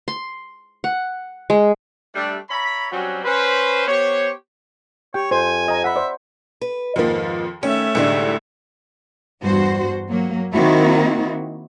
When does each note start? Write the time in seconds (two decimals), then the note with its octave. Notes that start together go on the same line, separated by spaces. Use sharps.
0.08 C6
0.84 F#5
1.50 G#3
2.15 G3 A3 D4
2.50 C#5 E5 A#5 B5
2.91 F#3 G3 C4 C#4 F#4
3.25 C#4 B4 C5
3.88 B3 G4 C5 C#5
5.14 G4 C#5 G5
5.31 F2 C5 G#5
5.68 D#5 A#5
5.84 E5 F#5 B5
5.96 C5 D5
6.61 B4
6.96 F2 G#2 D#3 F3 A#3
7.63 D#3 A3 C#4 E5
7.95 C2 A2 D3 G3 G#3 D#4
9.42 E2 G2 F#4 C5
10.09 F#3 A#3
10.53 D#3 A#3 C4 E4 F#4